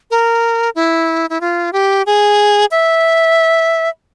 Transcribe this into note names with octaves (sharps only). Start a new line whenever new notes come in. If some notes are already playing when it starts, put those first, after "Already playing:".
A#4
E4
E4
F4
G4
G#4
E5